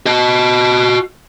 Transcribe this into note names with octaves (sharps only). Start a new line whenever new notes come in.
F#4 D#5